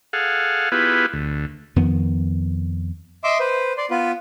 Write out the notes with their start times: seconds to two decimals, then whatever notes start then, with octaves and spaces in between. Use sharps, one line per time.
0.13 G#4 A4 F5 F#5
0.72 B3 E4 F4 G4 G#4 B4
1.13 D2
1.76 F2 D#3 B3
3.24 D#5 E5 C6 D6 E6
3.39 B4 C5
3.77 D5 C6
3.90 B3 F4 B4